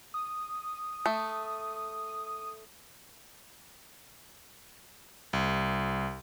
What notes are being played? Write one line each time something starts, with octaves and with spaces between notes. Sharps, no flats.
D#6
A3
C2